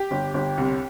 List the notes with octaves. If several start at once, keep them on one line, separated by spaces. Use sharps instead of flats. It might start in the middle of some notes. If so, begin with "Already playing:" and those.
Already playing: G4
G1
G1
C2